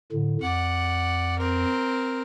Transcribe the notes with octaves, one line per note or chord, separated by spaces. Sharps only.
A2 D3
F2 D5 F#5
C4 A#4